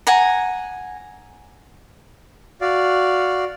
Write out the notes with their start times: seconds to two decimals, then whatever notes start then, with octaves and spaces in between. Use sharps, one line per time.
0.07 F#5 G#5 A#5
2.61 F#4 D5 F5